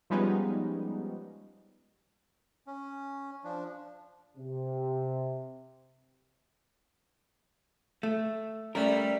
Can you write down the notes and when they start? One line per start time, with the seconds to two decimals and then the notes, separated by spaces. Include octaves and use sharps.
0.10 F3 G3 G#3 B3 C#4 D#4
2.67 C#4
3.44 F3 D4
4.37 C3
8.03 A3
8.75 G3 A3 C#4 A#4